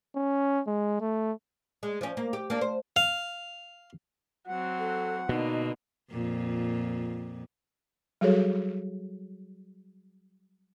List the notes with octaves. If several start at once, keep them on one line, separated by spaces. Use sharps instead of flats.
C#4
G#3
A3
G#3
F3 C#4
A#3
G4
A#3 D4
C5
F5
F#3 C4 F#5
A4
B2 D3 A#3 D#4
F2 A#2
F#3 G3 F#4 G#4 A4 C#5